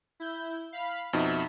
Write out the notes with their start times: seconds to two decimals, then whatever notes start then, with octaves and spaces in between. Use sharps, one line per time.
0.20 E4 G6
0.72 F5 B5
1.13 F2 B2 D#4 E5